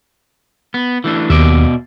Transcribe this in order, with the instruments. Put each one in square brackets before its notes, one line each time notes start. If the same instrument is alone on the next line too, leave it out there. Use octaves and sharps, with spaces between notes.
[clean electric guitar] B3
E3 A3 D4
[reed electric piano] D#2 [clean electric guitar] B2 D5 E5